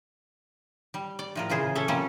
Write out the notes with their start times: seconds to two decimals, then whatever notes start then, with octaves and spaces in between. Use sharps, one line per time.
0.94 G3
1.19 D5
1.35 A2 F3 A#4
1.50 A#2 C#3 E3 G#4 C5
1.75 C#4 A4 C#5 E5
1.88 C3 F3 G3 A#3 C#4 A4